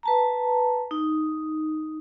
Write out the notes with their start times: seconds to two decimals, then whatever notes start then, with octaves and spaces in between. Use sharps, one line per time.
0.03 B4 A5 A#5
0.91 D#4